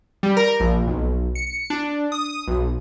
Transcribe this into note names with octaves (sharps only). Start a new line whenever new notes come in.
G3
A#4
A#1
B1
C#7
D4
D#6
B1